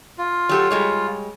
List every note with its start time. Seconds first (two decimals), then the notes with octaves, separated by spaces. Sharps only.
0.18 F4
0.49 F#3 G4 A4
0.71 G3 G#3 C#5